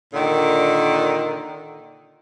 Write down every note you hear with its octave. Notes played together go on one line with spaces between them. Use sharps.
A#2 D3 D#3